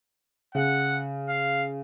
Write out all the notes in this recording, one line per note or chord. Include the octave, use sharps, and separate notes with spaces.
C#3 F#5
F5